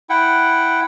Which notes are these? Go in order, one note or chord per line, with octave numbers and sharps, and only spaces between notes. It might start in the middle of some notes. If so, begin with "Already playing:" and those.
E4 F#5 G5